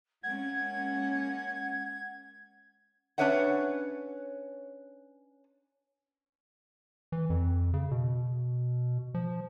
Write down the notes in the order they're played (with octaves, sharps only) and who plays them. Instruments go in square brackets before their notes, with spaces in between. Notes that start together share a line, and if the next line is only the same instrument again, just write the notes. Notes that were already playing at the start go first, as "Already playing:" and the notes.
[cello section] G#3 A#3 C#4 [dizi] F#5 [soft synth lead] G#6
[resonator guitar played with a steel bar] C#4 D4 B4 C#5 E5 F#5
[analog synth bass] E3
F2
C#3
B2
F3